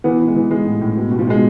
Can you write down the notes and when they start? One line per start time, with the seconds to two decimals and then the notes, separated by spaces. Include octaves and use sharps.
0.04 E3 B3
0.20 E3
0.27 G#3
0.36 E3
0.50 E3 G#3
0.66 A2
0.81 A2
0.97 B2
1.11 B2
1.19 F3
1.27 B2 G#3